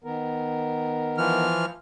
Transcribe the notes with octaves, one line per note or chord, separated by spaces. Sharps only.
D#3 B3 A#4
E3 F3 F6